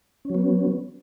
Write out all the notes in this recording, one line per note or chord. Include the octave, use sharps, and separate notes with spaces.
F#3 B3 C#4